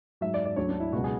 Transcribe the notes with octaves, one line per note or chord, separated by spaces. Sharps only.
G#2 F#3 E5
D5
D5
D2 D3 F#3 C#5
D4
E4
C#2 B2 F#3 F#4
G#4